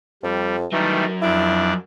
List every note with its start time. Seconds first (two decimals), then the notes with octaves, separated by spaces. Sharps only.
0.23 F2 G3
0.72 D#3 E3 F#3 G3 A3 A#4
1.22 F2 D4 E4 D5